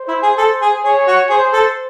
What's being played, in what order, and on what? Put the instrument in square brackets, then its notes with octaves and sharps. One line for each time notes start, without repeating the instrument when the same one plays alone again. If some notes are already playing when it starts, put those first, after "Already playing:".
Already playing: [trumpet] C5
[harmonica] E4
G#4
A4
G#4
[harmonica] G#4 [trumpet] C#5
[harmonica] F#4
[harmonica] G#4 [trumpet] C5
[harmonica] A4